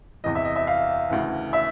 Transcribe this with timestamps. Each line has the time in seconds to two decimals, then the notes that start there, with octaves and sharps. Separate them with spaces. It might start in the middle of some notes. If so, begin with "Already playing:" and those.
0.24 E2 C3 E3 D#5
0.35 E5
0.45 D#5
0.56 E5
0.67 F5
1.10 D2 C#3 E3
1.53 E5